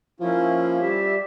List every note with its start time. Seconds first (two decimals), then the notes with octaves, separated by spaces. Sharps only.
0.20 F3 A#3 C#4 E4
0.80 G3 G4 E5